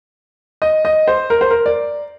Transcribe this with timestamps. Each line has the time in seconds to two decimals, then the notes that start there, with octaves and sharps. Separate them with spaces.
0.62 D#5
0.85 D#5
1.07 C5
1.30 A#4
1.41 C5
1.51 A#4
1.66 D5